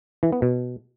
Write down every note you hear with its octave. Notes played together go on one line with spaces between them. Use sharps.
E3
B3
B2